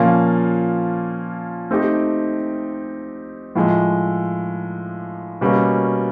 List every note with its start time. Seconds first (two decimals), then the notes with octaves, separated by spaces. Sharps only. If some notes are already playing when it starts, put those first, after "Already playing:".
Already playing: A#2 F3 A#3 C#4
1.71 A3 C4 D#4 G4
3.56 A2 F3 G#3
5.41 B2 G3 A#3 C#4 F#4